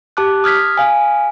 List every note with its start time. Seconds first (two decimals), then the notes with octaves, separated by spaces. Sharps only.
0.17 G4 A5 D6 F#6
0.44 D#6 F6 G#6 B6
0.77 F5 G#5